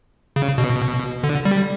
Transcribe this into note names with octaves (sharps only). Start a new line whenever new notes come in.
C#3
B2
D3
G3